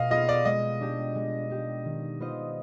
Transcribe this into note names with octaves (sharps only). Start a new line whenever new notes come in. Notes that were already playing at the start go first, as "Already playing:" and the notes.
Already playing: B2 D#5 F5
B3 F4 G#4 D#5
D5
G#3 D#5
D4 G4
G#3
D4 G4
D#3
B3 F4 C5 D#5